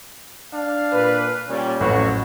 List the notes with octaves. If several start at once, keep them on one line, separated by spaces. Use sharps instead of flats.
D4 F5
A#2 B4
A#2 G3 C#4
A1 F2 F#3 F#4